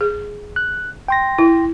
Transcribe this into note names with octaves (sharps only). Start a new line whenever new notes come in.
G#4
F#6
G5 C6 A#6
E4